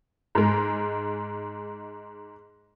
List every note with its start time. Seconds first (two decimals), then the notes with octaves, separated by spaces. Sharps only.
0.35 G#2 G#3